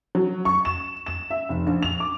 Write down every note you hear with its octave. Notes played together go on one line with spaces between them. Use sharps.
F#3
C#6
E7
E7
E5
F1
A#1
F7
D6